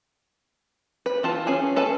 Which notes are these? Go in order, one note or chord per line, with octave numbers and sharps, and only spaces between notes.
B4
E3 F4 A5
C#4 G#4 G#5
C#4 A4 B4 G#5 A5